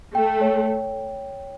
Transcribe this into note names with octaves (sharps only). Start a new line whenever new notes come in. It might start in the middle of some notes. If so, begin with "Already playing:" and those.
A3 G5
C#5